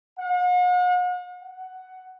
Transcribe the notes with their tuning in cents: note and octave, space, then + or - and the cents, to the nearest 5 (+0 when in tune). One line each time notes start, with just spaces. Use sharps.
F#5 -45
F#5 +10